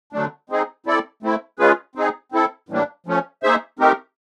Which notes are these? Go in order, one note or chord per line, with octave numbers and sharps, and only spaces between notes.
D3 F#3 A3 D4
G#3 C4 D#4 G#4
C4 E4 A4 D5
A3 C4 E4
G#3 C#4 F4 G#4 B4
C4 D#4 G#4
C4 E4 A4
A2 E3 G3 A#3 D4
F3 A3 C#4
A#3 D#4 G#4 C5 E5
A3 C4 D#4 G4 A#4